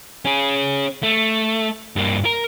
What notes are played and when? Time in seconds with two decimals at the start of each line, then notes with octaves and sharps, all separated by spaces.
0.25 C#4 G#4
1.03 A3
1.96 G2 A#3
2.25 A#4